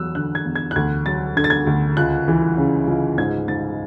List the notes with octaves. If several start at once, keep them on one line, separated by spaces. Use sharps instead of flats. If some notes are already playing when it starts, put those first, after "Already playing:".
Already playing: E2 F#3 E6 F#6
D3 F#6
G#6
E2
G#6
F#6
D2 G#6
F#3 A6
D3 G#6
A6
G#6
D2
C#2 F#6
E3
C#3
C#2
G#2 G#6
G#2 A6